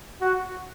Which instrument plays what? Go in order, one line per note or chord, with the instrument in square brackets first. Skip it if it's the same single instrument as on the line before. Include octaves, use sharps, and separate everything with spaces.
[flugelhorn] F#4